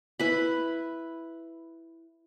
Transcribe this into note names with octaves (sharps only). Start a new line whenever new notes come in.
E4 B4 B5